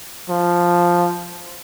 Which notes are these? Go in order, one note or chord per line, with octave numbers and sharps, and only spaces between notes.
F3